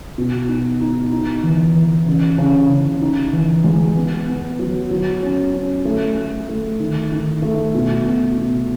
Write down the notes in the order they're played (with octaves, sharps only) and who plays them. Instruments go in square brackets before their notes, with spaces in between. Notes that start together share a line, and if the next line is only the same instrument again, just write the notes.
[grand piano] B2
D#4
D#4
D#4
E3
E3
C#3
C#3
C#3
D#4
E3
G#3
B3
B3
F#3
F#3
C#4
C#4
A3
A3
A3
D#3
D#3
A3
B2
B2
B2